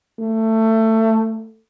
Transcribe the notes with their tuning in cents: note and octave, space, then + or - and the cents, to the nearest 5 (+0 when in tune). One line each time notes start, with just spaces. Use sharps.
A3 +20